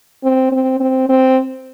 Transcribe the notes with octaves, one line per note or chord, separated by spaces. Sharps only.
C4
C4
C4
C4